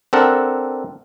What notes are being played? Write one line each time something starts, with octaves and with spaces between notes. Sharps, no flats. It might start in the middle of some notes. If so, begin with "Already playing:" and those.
C4 D4 A4 A#4 F#5